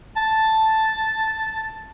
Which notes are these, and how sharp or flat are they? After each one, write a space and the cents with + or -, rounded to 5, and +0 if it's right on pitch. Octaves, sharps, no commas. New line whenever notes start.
A5 +0